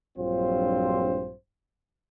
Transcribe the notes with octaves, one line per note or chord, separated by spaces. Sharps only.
A#1 G2 F#3 C4 F4 C5